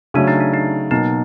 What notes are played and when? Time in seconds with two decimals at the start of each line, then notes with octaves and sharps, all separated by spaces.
0.14 C#3 F#3 A3 D4
0.28 D#4
0.40 D4
0.54 D#4
0.91 B2 F#3 A#3 D#4